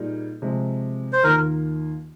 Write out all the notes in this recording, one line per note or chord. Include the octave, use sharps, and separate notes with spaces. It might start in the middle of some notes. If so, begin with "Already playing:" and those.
Already playing: A#2 G3 A#3 D#4 G#4
C3 F3 G#3
C5
D#2 D#3 A#3 F4 A#4